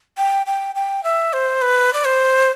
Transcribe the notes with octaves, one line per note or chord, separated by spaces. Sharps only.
G5
G5
G5
E5
C5
B4
D5
C5